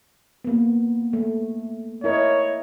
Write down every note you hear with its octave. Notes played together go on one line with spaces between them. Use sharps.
A#3 B3
A3
E4 A#4 C#5 D#5